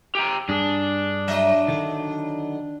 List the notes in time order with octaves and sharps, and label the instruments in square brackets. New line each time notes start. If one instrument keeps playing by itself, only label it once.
[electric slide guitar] G4 G5 A#5
[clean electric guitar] G2 G#4 [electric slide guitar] D4
[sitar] F#3 D#5 E5
[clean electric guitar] D3 D#3